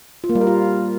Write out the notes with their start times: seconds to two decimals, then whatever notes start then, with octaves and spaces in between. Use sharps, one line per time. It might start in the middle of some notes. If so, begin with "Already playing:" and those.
0.24 F4
0.30 A#3
0.35 G3
0.41 A#4
0.47 F4